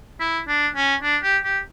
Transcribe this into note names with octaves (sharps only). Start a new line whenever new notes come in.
E4
D4
C#4
D4
G4
G4